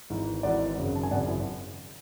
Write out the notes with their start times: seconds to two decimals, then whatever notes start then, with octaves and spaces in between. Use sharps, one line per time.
0.10 G#1 G#2 E3
0.43 G#1 G#2 E3 D5 F#5
0.77 G#1 F#2 C#3
0.95 A5
1.03 G#5
1.11 G#1 F#2 C#3 D5 F#5
1.27 E4 G#4